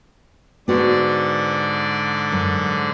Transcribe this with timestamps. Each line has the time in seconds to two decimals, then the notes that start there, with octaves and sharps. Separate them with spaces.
0.68 G#2 D3 B3 F#4 D5
2.32 F#2